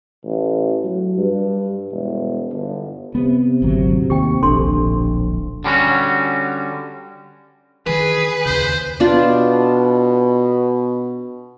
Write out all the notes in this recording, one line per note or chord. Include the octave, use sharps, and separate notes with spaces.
A1
F#3
G2
E1
G1
C3 B3
G#1 D2 F#3
D#2 G4 G5
D1 A#1 D4 A4 C6
D3 G3 C#4 F#4
D#3 E3 G#4 B4
D#2 C#3 C5
B2 D4 F4 D5